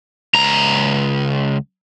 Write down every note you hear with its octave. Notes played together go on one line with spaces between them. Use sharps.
C#2 A#5